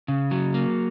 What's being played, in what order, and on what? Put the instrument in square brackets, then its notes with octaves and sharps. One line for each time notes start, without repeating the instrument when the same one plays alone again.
[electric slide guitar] C#3
F#3
A#3